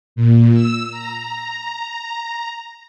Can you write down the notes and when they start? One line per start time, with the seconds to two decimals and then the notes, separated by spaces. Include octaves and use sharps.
0.16 A#2
0.54 E6
0.91 A#5